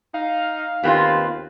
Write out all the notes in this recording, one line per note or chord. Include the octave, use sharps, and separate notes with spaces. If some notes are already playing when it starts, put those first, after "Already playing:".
D#4 F5
D#2 B3 C4 F4